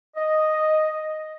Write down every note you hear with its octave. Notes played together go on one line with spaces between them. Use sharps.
D#5